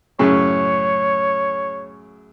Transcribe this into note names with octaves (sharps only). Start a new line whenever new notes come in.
F#2 A2 C#3 C#5